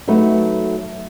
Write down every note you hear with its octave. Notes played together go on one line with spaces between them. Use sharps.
F#3 A3 D#4 B4